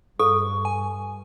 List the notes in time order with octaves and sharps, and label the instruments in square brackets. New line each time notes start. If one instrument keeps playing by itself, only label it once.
[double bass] G2 [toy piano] A4 [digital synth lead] C#6
[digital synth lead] G#5